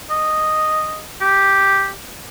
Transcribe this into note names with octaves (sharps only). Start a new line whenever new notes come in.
D#5
G4